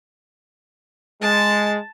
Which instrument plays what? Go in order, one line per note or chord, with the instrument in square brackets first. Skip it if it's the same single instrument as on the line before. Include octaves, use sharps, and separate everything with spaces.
[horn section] G#3 [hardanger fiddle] A5